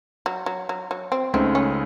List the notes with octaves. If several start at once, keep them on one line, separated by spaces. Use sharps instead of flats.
F#3
F#3
F#3
F#3
C4
C#2 C#3 A3 C4 D#4
C#4